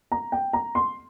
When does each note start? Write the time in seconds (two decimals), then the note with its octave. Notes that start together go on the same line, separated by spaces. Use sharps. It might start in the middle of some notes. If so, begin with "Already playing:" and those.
0.12 A#5
0.32 G5
0.53 A#5
0.75 C6